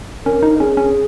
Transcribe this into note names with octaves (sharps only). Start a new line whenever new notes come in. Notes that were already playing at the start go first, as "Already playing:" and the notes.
C#4 A#4
D#4
C#4 G#4
C#4